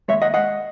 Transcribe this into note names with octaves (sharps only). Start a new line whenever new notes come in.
D#2 D#3 G#3 C#5 E5
D#5 F#5
D#5 F#5